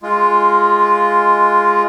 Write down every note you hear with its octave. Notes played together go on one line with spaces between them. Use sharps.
G#3 F4